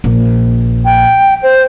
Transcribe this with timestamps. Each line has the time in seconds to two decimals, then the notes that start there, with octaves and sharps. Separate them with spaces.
0.04 A#1
0.85 G5
1.43 C5